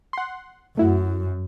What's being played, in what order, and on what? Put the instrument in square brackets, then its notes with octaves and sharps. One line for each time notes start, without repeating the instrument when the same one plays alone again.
[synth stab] F#5 C6
[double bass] F#2 [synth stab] A3 E4 F#4